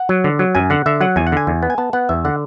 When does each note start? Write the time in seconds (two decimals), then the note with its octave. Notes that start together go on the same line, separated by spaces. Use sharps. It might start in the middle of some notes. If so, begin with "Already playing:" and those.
Already playing: F#5
0.09 F#3
0.24 D3
0.39 F#3
0.55 F#2 G#5
0.70 D3 F#5
0.86 D3 E5
1.01 F#3 F#5
1.16 E2 G#5
1.27 F#5
1.32 D3 G#5
1.47 E2
1.63 B3
1.70 G#5
1.78 B3 A5
1.93 B3 F#5
2.09 E2 E5
2.25 D3 F#5